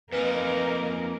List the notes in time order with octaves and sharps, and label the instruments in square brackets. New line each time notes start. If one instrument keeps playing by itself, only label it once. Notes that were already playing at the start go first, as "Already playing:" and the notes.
[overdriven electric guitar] F2 D#4 [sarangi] A#3 [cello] A#4 [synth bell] B4 G#5 F6